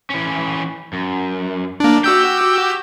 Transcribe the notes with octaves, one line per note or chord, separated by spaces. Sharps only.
E3 C#4
F#2
A#3 D4
F#4 G4 E6 G6